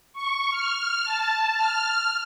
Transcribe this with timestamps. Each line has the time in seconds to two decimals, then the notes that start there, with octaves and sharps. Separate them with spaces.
0.13 C#6
0.50 F6
1.04 A5
1.55 F6